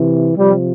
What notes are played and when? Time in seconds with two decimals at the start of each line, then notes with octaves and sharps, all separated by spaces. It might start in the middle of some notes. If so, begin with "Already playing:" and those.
Already playing: C3 E3
0.36 C3 F3 G3